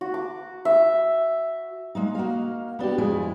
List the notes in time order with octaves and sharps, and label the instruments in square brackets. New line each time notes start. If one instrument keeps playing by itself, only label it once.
[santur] F#4
D6
E5
[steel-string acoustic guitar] G#3 A#3 D#4
A#3 F#4 D#5 F5
B3 D4 F#4 G4
F2 G#3 E4 G#4